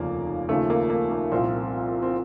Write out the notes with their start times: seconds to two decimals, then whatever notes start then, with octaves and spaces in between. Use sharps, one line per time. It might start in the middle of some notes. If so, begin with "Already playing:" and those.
Already playing: F1 D#2 C#3 F3 A#3
0.49 D#2 C#3 F3 A3
0.70 A#3
0.90 A#3
1.11 A#3
1.32 C2 A#2 F3 C4
2.02 C4